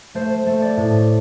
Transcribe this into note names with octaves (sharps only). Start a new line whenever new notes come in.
A3 C5
A3
D5
A2